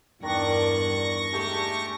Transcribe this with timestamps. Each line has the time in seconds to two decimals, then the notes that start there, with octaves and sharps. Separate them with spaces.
0.23 E2 G2 D#3 D4 D5 C#6 A#6
1.33 G#3 A3 G4